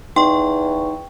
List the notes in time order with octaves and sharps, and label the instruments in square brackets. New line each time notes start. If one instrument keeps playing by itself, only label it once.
[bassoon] E2 [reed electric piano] D#4 [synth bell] G5 C#6 [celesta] C6